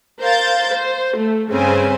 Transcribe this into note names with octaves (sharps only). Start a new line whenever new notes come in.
A#4 C5 F5 G6 A6
C5
A3
G2 C#3 C4 B4 C5 G#5